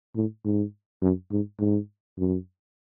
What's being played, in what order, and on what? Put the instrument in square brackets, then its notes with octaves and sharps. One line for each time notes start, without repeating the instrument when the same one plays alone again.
[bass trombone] A2
G#2
F#2
G#2
G#2
F#2